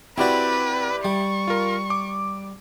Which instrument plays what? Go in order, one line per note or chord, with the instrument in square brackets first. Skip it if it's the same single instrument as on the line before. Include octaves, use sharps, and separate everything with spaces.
[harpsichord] C4 F#4 [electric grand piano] E4 G4 D5 [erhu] B4
[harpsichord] G3 [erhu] C#6
[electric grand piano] F4 A#4
D6